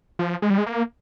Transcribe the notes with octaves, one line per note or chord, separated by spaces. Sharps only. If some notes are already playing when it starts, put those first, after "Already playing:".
F3
G#3
G3
G#3
A#3